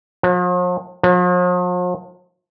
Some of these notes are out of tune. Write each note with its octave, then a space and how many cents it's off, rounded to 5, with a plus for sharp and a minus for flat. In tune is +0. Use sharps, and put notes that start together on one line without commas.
F3 +45
F3 +45